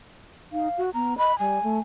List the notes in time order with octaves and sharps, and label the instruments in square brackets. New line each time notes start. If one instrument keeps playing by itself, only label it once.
[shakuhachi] D#4 [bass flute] F5
[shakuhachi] F#4
[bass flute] B3 [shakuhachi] A#5
[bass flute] D#5 [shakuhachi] B5
[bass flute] G3 [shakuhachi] G#5
[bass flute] A3